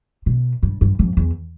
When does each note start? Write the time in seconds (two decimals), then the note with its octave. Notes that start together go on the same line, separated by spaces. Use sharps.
0.26 B2
0.63 G2
0.81 G2
0.99 F2
1.17 E2